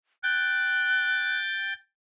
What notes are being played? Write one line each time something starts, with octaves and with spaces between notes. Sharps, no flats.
G5 F#6 A6